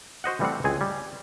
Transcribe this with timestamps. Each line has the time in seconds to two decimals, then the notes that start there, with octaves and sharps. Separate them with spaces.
0.24 F#4 C5 D#5 F#5
0.40 E3 G3 A3 C4 F#5
0.64 C#2 C4 G#4 G#5
0.81 G3